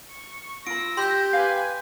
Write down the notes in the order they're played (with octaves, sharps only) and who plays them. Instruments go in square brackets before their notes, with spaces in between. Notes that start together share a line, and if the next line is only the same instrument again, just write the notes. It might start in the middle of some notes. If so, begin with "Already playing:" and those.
[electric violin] C#6
[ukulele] F4 B5 [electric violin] E6 A#6 [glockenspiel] D7
[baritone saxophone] G4 [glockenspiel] C6 G6
[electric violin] B4 G#5 [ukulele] F5